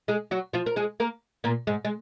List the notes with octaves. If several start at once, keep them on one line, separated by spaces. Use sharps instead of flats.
G#3 G#4
F#3 F#4
F3 F4
A#4
G#3 G#4
A#3 A#4
A#2 A#3
G#2 G#3
G#3